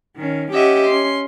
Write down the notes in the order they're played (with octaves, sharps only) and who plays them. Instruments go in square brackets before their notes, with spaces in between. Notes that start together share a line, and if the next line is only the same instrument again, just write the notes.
[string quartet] D#3 C#4
C#4 G4 D#5 E5 F#5
C#4 C6